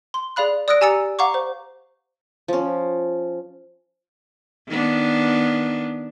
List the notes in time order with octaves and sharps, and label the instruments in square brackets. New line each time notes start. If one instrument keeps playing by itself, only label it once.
[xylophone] C6
G#4 D5 F5 B5 F#6
D5 D#6 E6 F#6 A#6 D7
G4 G#5 A#5 E6 A6 C#7
F5 F#5 A#5 C#6 D6
C5
[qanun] F3 C#4
[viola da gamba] D#3 B3 D4